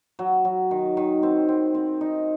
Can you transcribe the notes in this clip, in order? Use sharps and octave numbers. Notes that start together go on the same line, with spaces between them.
F#3
F#3
D#3
D#3
C4
C4
C4
D#4